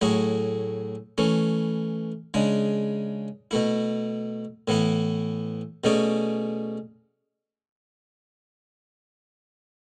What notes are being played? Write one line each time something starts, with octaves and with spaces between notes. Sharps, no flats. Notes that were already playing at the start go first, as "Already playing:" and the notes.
A2 F#3 A3 E4 G#4
E3 A3 C#4
C#3 G#3 D4
B2 A3 E4
A2 E3 B3 E4
B2 A3 C#4 G#4 D5